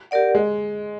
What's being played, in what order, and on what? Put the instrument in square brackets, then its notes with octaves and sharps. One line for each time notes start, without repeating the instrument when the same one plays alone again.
[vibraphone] G4 A#4 D5 F#5
[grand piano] G#3